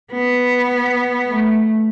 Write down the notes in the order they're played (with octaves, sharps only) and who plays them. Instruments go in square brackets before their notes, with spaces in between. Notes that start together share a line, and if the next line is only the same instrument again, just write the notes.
[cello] B3
A3